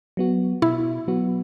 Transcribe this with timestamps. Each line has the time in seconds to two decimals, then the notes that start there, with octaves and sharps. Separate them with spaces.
0.17 F#3 B3 F#4
0.62 B2 E4
1.08 F#3 B3 F#4